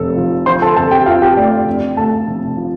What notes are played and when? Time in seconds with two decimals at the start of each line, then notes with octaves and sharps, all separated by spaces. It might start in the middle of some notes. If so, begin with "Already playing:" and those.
Already playing: F1 A4
0.16 F3
0.46 F3 C5 C6
0.62 A4 A5
0.76 F2 A4 A5
0.91 G4 G5
1.06 F2 F4 F5
1.22 G4 G5
1.36 A3 D5
1.51 D5
1.66 F2
1.97 A3 A4 A5
2.27 F1
2.57 F3